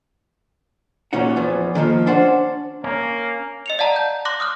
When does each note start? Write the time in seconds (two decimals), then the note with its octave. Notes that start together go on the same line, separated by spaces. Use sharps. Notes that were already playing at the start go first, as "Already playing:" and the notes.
1.13 E2 A#2 C#4 D#4 F#4 F#5
1.36 E2 E3 F3
1.75 D3 D#3 F3 A#3
2.06 C#4 D4 C5 F#5
2.84 A#3 C#4
3.66 D#5 C#7 F7
3.79 D5 F5 F#5 A5 A#5
3.96 G6
4.25 C6 D6 F#6 A#6
4.40 D#6 F6 F#6